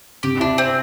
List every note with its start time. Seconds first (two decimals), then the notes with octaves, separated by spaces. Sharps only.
0.23 C3 G4
0.40 D4 E4
0.58 C4